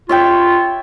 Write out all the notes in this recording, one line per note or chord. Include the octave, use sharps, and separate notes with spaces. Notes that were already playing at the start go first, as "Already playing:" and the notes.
F4 C#5 E5 G5